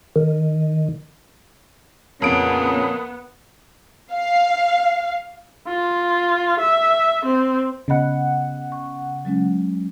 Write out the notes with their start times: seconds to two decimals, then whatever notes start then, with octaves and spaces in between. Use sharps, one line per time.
0.16 D#3
2.22 F2 A#2 C#3 A#3 B3 C#4 D7
4.13 F5
5.68 F4
6.60 E5
7.25 C4
7.88 C#3 B3 D#5 F#5 B5
8.72 C#6
9.25 F#3 G#3 C#4